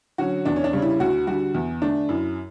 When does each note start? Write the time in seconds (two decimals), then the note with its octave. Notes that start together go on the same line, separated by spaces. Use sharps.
0.18 D3 F#3 C#4 F#4
0.45 E2 D4
0.56 C#4
0.64 D4
0.73 C#3 G3 C#4
0.82 E4
1.00 D2 F#4
1.27 D3 G3 F#4
1.54 E2
1.82 D3 A3 D4
2.09 F#2 E4